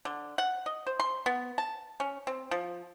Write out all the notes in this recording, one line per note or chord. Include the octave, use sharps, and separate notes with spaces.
D3
F#5
D#5
C5
C6
B3
A5
C#4
C4
F3